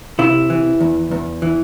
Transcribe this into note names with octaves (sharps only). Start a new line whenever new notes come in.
C3 E4
E3
E2
E2
E3